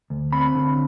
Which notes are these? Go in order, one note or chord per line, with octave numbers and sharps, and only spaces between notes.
D2
C4 B5
D3